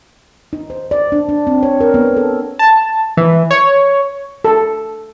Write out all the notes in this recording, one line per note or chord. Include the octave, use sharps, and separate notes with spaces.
D#4
C5
D5
D4
D4
C4
C#5
A#4
B3
A4
A5
E3
C#5
A4